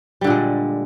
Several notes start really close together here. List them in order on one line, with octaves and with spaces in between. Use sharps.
G3 D3 A#2 G#3